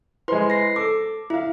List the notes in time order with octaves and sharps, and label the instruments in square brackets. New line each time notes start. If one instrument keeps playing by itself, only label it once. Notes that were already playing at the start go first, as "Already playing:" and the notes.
[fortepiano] G#3 C6 [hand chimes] E4 B4 C5
[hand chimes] A#6 C7
[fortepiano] A4 [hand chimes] D6
[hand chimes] E4 [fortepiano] E5 F5